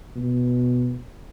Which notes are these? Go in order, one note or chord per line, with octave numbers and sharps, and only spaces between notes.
B2